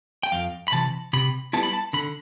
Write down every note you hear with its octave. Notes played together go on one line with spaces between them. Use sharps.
G5
F2 F5
B5
C3 E3 A5
C3 B5
G3 B3 E4 A5
B5
A5
D3 B5